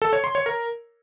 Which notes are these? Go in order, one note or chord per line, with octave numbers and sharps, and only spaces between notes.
A4
C#5
C6
C#5
A#4